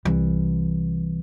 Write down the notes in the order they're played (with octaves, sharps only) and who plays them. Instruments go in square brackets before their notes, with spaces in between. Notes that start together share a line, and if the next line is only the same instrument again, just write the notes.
[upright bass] C2 E3